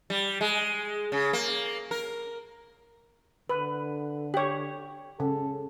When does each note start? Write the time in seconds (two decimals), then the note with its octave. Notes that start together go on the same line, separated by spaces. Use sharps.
0.10 G3
0.41 G#3
1.12 C#3
1.33 A#3
1.91 A#4
3.49 D3 B4
4.34 G4 C#5
5.20 C#3 A4